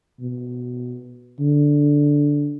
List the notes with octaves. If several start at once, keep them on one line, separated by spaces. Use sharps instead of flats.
B2
D3